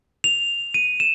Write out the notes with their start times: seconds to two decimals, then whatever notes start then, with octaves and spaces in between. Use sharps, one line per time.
0.24 F7
0.74 D#7
1.00 E7